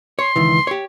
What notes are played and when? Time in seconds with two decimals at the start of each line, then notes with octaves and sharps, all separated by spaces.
0.19 C#5 C6
0.36 C#2 D#3 E3
0.67 G4 C#5